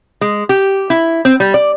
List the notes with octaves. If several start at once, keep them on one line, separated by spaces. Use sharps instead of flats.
G#3
G4
E4
C4
G3
D5